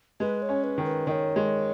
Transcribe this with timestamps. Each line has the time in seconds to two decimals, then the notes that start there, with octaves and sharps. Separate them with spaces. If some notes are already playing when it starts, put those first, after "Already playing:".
0.20 G#3 B4
0.42 C#5
0.49 C#4
0.64 B4
0.78 D#3
0.85 B4
1.07 D#3 D#5
1.11 C#5
1.36 G#3